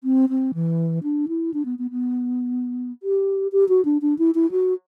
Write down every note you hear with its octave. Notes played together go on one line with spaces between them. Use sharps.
C4
C4
E3
D4
E4
D4
B3
B3
B3
G4
G4
F#4
D4
D4
E4
E4
F#4